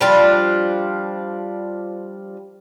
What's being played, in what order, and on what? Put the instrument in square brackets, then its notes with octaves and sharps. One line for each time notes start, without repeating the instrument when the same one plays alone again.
[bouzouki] F3 G3 D4 F4